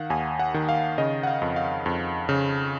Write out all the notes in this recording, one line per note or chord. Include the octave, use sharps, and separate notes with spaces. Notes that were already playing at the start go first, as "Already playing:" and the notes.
Already playing: D#3 F5 F#5
D#2 G#5
F#5
D#3
F5
C#3 D#5
F#5
F5
F2
F5
F2
C#3